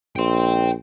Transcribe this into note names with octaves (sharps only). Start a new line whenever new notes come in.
A#1 G5 C6